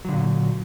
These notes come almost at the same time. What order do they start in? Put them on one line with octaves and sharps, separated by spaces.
F#3 D3 A#2